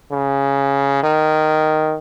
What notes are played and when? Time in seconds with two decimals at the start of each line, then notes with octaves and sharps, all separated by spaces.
0.11 C#3
1.03 D#3